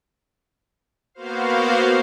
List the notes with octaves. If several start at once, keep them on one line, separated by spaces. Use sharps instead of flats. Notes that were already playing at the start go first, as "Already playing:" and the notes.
A#3 B3 F#4 C5 F5